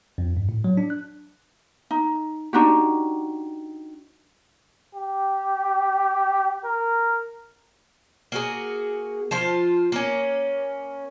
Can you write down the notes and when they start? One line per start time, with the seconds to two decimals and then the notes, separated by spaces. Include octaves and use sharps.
0.18 F2
0.37 G2
0.49 A2
0.64 F#3
0.77 D4
0.90 F#6
1.91 D#4
2.53 D4 D#4 F#4 G4
4.95 G4
6.64 A#4
8.32 A#3 F#4 G#4
9.31 F3 F4 C5
9.92 A#3 C#4